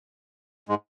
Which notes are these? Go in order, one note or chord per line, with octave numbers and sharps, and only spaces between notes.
G#2 G#3